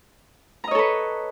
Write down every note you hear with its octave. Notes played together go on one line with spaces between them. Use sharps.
A4 B4 C#5 D#5 A#5